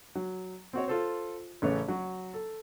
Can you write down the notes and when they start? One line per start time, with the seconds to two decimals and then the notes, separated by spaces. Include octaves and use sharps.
0.15 F#3
0.73 C4 F#4 C#5
0.88 F4 A4 C5
1.62 A1 C#3 A3 B4 C#5
1.88 F#3 F#4
2.33 A4